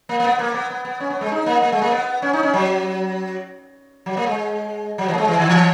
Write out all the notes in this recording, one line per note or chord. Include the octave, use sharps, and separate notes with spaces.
A#3
A#3
B3
A#3
B3
B3
B3
C#4
B3
G#3
D#4
A#3
A#3
G#3
A#3
B3
C#4
D#4
C#4
F#3
F#3
A#3
G#3
F#3
E3
A#3
G#3
E3
D#3
E3